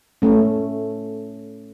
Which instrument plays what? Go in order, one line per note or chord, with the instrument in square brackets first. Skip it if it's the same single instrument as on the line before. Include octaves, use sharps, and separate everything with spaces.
[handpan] A3 C#4